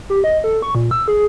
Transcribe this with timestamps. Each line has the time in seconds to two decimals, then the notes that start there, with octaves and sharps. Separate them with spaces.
0.10 G4
0.24 D#5
0.44 A4
0.62 C#6
0.75 A#2
0.91 E6
1.08 G#4